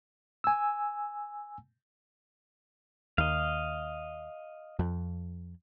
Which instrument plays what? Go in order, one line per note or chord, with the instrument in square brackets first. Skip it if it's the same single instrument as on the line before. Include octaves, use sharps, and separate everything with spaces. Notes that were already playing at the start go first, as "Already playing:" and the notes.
[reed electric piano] G#5 E6
[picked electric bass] D#2 [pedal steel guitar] D#5 F5
[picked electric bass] F2